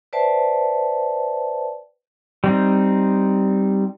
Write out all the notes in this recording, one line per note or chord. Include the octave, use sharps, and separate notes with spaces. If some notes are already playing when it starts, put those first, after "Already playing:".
B4 C5 D5 E5 G5 A5
G3 C4 D#4